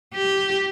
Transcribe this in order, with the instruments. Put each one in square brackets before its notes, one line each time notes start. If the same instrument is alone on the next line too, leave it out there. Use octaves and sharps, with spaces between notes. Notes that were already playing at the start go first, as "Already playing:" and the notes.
[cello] G4